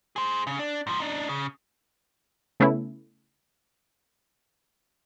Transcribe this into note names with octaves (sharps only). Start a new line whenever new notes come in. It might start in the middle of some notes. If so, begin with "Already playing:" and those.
G#4 C5
C#3
D4
G#2 F3
D4 D#4
C#3
C#3 A3 B3 C#4 E4